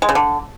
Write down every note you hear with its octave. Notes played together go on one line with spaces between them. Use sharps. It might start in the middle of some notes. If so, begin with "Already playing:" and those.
G#3
C#3
D3